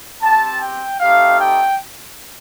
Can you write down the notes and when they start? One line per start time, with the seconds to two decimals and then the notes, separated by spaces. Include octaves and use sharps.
0.21 C4 G4 A5
0.61 G5
1.00 A3 C4 D#4 G4 F5
1.39 G5